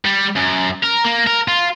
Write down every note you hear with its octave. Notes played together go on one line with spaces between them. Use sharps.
G3
F#2
A#4
A#3
A#4
F4